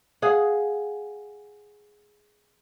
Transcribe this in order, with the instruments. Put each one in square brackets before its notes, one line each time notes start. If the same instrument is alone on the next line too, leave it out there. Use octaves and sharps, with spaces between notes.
[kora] G#4 F5 F#5